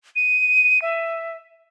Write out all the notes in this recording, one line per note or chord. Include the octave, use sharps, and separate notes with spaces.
D#7
E5